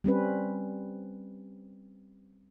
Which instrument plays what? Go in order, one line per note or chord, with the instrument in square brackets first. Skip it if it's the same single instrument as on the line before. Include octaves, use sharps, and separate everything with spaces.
[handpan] G3 C4 C#4 B4